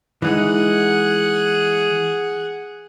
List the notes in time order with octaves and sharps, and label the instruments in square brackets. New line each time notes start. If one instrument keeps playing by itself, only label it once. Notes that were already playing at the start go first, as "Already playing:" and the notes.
[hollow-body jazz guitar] E3 G#3 D#4 [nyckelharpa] G#4 F#5